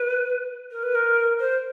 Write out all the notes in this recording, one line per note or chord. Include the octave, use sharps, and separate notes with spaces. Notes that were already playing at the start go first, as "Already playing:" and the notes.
Already playing: B4
A#4
B4
A#4
C5